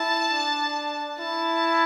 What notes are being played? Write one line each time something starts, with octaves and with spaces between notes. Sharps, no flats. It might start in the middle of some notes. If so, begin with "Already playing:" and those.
Already playing: E4 A5
D4
E4 A5